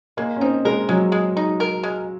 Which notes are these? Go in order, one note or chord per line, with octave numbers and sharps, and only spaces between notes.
G#3 A#3
C#4
C4 D#4
G#3 A#4
F#3 G#3
G#3
D#4
A#4
G#3